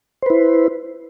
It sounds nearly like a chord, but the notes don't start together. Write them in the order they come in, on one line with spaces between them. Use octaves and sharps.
C5 B4 E4